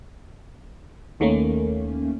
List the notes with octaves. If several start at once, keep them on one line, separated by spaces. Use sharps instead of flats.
D#2 D#3 A3 A#3 C#4